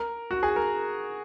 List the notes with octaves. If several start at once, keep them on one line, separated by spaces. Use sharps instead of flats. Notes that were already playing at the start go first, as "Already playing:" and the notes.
Already playing: A#4
F#4
G#4
A#4